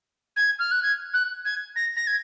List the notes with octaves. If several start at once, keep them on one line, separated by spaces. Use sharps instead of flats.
G#6
F6
F#6
G#6
F#6
G#6
A#6
A#6
G#6